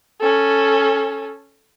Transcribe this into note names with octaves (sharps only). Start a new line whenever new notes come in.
C#4 A4